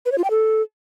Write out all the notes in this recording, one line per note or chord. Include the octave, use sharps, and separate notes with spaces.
B4
C#5
F4
G5
A4